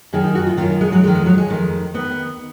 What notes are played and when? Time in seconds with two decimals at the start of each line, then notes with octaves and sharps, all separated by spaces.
0.13 F#2 D#3 G#4
0.24 D#4
0.35 F#4
0.47 F4
0.57 D#3 F4
0.61 F#2
0.70 D#4
0.81 G#3
0.92 F#3
1.03 F2 G#3
1.07 D#3
1.14 G#3
1.26 F#3
1.38 G#3
1.48 F2 D#3
1.94 D#2 D#3 B3